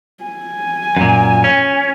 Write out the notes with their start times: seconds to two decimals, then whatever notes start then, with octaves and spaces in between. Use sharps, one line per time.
0.24 G#5
0.97 F#2 A#2
1.44 C#4